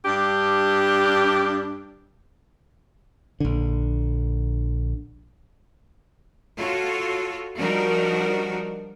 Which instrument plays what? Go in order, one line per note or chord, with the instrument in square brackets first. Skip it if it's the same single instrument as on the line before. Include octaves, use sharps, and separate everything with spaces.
[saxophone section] G2 D4 G4
[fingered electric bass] A#1 D3
[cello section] F4 F#4 A4 C#5
F3 G3 D4 D#4 F#4 A#4